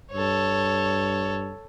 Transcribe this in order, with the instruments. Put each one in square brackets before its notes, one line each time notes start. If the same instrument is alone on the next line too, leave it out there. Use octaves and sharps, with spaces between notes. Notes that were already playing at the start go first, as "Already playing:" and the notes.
[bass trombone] G2 [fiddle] A4 C#5